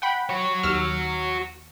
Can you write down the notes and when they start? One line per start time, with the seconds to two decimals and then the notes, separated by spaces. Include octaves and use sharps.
0.02 F#5 G5 B5
0.29 F#4 C#5
0.63 D#2 E6 F6